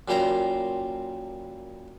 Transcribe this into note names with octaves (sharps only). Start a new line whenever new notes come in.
F#2 A#2 G3 G4 C5 A#5